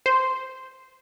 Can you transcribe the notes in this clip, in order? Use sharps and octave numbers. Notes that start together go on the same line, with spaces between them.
C5